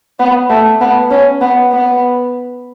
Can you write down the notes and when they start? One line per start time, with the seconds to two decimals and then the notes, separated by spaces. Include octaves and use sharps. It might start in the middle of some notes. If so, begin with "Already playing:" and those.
0.19 B3
0.49 A3
0.81 B3
1.11 C#4
1.41 B3
1.72 B3